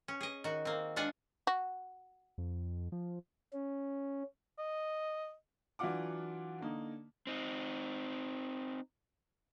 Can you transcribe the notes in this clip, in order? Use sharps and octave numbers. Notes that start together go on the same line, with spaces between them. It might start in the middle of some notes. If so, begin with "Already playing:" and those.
C#4
G#4 D#5
D#3 F#4
A#3 C4
G#3 D4 F4 F#5 G#5
F#4
F2
F3
C#4
D#5
E3 F#3 D4 F4 F#5 D6
D3 A#3 D#4
C4 D#4